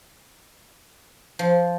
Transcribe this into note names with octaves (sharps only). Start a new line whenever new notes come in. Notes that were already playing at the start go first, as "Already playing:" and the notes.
F3